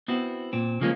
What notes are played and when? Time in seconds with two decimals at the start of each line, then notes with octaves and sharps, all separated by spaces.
0.08 B3 C4 E4 F#4
0.53 A#2 C4
0.81 C#3 F3 G#3 A#3 C#4